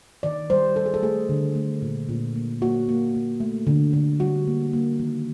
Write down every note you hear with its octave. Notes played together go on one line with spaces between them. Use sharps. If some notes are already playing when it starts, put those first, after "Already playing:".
D#3 D5
G3 C5
G3 A4
G#4
A4
A3 G#4
D3
A3
A#2
A#2
A#3
A#3 F#4
A#3
A#3
A3
D3
D3
G3 F#4
A#3
A#3
D#3